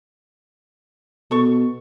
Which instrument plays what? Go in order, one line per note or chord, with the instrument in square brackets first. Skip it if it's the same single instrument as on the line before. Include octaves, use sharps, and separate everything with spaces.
[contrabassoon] B2 [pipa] A4 C#6